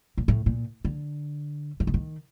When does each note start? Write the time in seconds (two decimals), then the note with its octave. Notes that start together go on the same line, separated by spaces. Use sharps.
0.18 A#2
0.28 A2
0.46 A#2
0.85 D3
1.80 D#3
1.87 D3
1.94 D#3